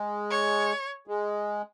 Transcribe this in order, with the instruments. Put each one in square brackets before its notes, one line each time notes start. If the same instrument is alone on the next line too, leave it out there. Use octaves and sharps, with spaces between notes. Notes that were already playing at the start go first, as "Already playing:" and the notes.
Already playing: [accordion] G#3
[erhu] C#5
[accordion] G#3